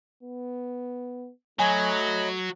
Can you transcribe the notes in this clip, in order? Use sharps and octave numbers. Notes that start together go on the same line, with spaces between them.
B3
F#3 A3 C#5 D#5 G#5 B5